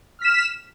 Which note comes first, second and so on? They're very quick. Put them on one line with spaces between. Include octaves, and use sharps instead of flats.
F6 B6 E7